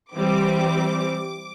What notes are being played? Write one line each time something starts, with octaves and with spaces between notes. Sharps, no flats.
E3 G3 C4 D6